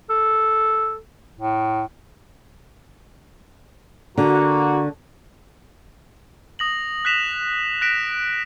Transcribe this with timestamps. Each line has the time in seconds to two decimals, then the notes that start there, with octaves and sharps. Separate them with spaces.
0.10 A4
1.37 A2
4.18 D3 A#3 F#4
6.59 D#6 A#6 F#7
7.05 F#6 A#6 B6 E7 F7
7.81 F#6 A#6 B6 D7 E7